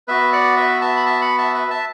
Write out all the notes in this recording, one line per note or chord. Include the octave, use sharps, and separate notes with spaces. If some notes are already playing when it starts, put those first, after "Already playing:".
B3 F#4 B4 E5
D5 F#5
B4 E5
E5 A5
B5
E5 A5
F#5 B5
E5 A5
B4 E5
E5 A5